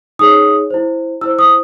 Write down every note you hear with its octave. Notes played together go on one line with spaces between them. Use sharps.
D#4 G#4 C#5 D#6
E4 C5
E4 C5 E6
D#6